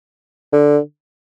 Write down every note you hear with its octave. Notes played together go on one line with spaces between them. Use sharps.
D3